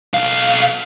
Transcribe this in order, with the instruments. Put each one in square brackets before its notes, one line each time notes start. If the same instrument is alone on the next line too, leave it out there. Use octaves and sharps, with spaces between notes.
[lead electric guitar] B1 F5